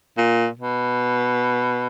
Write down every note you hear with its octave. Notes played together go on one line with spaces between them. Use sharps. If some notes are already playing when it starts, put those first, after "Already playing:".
A#2
B2